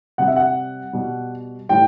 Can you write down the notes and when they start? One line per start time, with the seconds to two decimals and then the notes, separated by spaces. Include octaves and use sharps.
0.18 C3 G3 F#5
0.27 E5
0.36 F#5
0.93 B2 G3
1.69 A2 E3 G3 G5